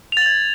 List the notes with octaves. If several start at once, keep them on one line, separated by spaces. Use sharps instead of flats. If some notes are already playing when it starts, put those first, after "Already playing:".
G#6 A6 F7 F#7